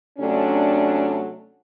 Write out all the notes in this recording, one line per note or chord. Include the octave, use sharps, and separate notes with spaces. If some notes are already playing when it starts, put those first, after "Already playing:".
C3 F#3 A3 C#4 D4